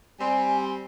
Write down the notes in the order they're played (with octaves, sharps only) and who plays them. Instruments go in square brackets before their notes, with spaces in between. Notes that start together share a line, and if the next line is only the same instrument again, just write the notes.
[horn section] G3 C4 [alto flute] G#5